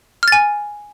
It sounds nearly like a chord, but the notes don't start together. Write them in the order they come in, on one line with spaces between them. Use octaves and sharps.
F6 A6 G#5